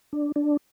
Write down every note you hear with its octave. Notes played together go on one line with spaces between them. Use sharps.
D4
D4